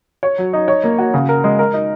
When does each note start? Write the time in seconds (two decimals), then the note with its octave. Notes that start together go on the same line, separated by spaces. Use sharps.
0.23 C#5
0.38 F#3
0.53 D#4
0.68 C#5
0.84 A#3
0.99 F#4
1.14 C#3
1.29 A#4
1.44 G#3
1.59 A#4
1.74 D#4